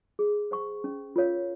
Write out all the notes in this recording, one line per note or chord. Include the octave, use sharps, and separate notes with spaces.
G#4
C5 F#5 C#6
C#4
F4 A#4 C#5 F5